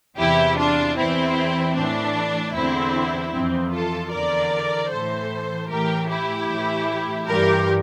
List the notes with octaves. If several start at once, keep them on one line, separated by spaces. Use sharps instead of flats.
E2 C3 E3 E4 G4
D4 F4
E2 E3 C4 E4
A2 E3 D4
E2 D3 C4 E4
F2 E3 C4
F4 A4
E2 D3 A#4 D5
A2 E3 A4 C5
A2 E3 G4 A#4
E4 G4
A2 E3
G2 E3 G4 A#4